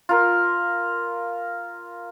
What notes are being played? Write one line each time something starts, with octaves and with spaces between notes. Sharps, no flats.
F4 A#4